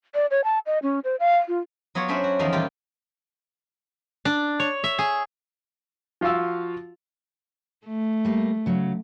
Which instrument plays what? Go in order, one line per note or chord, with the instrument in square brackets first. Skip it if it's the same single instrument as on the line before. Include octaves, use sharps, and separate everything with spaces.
[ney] D5
C#5
A5
D#5
C#4
C5
F5
F4
[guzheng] F#3 B3 F4 C#5 D5
C#4 D4 B4 C5 E5
F#4
E2 D#3 F3 A4 A#4 F5
A#2 E3 G3 F4 G4 G5
[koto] D4
C#5
E5
G#4
[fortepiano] F3 F4 F#4 F5 E6
[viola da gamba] A3
[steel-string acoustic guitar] G3 A#3
C#3 F#3